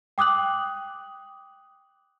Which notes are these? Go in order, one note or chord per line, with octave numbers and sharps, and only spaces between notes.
G5 D6 D#6 F#6 F#7